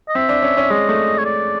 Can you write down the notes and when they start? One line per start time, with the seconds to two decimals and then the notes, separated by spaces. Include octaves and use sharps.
0.08 D#5
0.15 C4 E5
0.29 D4
0.43 C#4
0.57 C#4
0.70 G#3 D#5
0.89 A3
1.19 C#5
1.25 D5